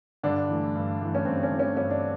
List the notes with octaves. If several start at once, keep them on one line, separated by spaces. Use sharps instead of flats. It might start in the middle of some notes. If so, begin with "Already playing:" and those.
G2 D3 D4
E3 A3
G2
E3 A3
C#4
G2 C4
C#4
E3 A3
C#4
G2 C#4
D4